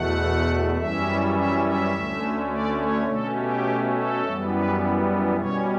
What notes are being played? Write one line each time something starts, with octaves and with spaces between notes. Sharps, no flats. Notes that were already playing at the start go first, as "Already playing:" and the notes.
Already playing: E2 B2 A3 F#5
F#2 E3 G3 C#4 E5
E5
E5
D2 D3 A3 C#4
D5
C#5
B2 A3 C#4 A4
G4
A4
F#2 E3 G3 B3
B4
B2 G3 C#4 C#5